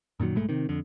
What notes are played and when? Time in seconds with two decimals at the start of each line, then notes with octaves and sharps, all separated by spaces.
0.20 F#2 A#2 D#3 F#3
0.35 B1 G#2 G#3 A3
0.49 C3 D#3
0.69 F2 D3